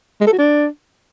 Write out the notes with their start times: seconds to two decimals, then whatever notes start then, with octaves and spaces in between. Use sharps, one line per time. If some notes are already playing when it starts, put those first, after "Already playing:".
0.21 G#3
0.27 A4
0.33 F#4
0.39 D4